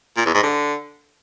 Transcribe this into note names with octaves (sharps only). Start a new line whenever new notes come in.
A#2
E2
G#2
D3